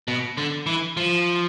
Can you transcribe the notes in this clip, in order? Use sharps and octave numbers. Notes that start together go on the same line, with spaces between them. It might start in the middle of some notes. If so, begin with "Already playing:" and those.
B2
D3
E3
F3